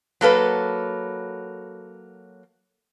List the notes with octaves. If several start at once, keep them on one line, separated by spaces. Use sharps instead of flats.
F#3 A#3 A4 B4